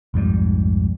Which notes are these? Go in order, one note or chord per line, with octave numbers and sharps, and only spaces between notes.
B1 F2 G#2 G3